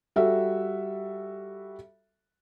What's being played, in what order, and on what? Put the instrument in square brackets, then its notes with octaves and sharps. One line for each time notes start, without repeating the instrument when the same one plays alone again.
[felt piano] G3 F#4 A4 E5